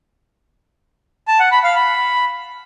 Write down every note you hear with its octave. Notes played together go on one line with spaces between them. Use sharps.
A5
F#5
B5
F5
B5